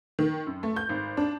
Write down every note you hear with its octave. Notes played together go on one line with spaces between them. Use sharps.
D#3
F#2
A3
G6
G#1
D4